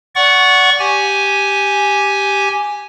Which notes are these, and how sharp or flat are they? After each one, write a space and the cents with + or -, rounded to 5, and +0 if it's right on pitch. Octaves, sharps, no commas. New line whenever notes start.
D5 -25 F#5 +0 C#6 +0
G4 +0 G#5 +0